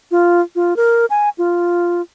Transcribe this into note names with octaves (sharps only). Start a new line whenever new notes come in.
F4
F4
A#4
G#5
F4